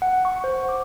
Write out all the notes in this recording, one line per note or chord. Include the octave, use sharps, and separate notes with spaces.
F#5
C#6
C5
D6